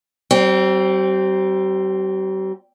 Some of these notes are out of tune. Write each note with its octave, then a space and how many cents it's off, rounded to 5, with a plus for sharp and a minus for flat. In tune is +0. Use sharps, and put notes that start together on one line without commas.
G3 -45 C4 +0